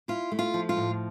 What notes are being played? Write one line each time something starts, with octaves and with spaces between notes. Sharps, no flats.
E4 F4
A3
F4
F3
F4
A2